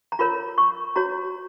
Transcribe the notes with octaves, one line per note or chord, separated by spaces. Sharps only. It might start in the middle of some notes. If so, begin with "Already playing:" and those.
A#5
F4 A#4 C#5 B5
C#6
F#4 C#5 A#5